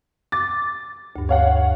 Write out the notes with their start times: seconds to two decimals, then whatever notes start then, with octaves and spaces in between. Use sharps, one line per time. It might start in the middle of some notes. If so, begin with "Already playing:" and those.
0.32 D6 A6
1.16 D2 G2
1.29 C#5 F5 F#5